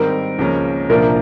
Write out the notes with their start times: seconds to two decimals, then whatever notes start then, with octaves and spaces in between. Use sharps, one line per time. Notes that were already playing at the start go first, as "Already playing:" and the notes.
Already playing: G#2 D#3 G3 C4 D#4 A#4
0.39 C#2 C#3 F3 A#3 C#4
0.89 C2 A#2 F3 A#3 D4 A#4